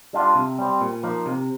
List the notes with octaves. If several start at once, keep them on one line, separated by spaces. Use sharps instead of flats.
G3 D4 F4
C3
G3 C4
A#2
F3 A#3 D#4
C3